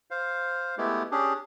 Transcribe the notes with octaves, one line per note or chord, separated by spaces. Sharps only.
C5 F5
G#3 A3 B3 E4 G4
C#4 D4 G4 G#4